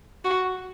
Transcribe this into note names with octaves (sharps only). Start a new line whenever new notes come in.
F#4